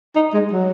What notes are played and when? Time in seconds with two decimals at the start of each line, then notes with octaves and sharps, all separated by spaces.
0.15 D#4
0.34 G#3
0.52 F#3